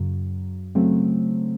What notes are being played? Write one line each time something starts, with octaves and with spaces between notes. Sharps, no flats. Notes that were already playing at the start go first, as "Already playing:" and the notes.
Already playing: F#2 C#3 F#3
C#3 F#3 A3 C4